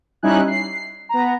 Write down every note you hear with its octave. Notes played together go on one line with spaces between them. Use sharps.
G3 C#4 D#4 E4 G#5 F#6
C7
B3 A#5